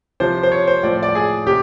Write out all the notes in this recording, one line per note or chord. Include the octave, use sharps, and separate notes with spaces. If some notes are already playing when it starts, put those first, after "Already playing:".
C3 F3 C5
C5
C#5
C5
A2 F3 D5
D5
G#4
C3 G4